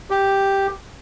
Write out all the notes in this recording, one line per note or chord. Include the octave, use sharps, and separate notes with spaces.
G4